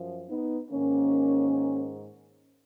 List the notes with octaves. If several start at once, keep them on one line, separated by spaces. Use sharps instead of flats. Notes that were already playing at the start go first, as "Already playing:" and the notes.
Already playing: F#2 F3
B3 D#4
G#2 D#3 A#3 C#4